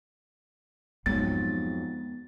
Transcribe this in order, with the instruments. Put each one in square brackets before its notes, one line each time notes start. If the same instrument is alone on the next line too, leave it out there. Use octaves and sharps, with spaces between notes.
[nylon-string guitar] F2 G#2 F#3 [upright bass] G#3 B3 [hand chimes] A6